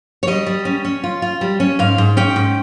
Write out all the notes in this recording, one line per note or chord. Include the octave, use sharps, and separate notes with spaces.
C#5
G3 D#5
G3
C#4
C#4
F4
F4
G3
C#4
G#2 F5
G#2
C#4 G5
G#2